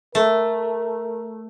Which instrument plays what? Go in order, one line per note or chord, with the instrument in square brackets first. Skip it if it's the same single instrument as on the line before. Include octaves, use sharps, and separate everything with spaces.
[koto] A3 [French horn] A#4